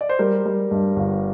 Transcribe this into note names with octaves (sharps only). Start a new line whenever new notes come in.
D5
C5
G3 A#4
G3
G2
G1